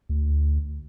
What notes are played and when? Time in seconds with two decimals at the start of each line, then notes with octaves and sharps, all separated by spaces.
0.09 D2